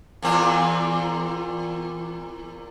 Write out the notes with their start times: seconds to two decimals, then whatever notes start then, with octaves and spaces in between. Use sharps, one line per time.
0.22 E2 A#2 C4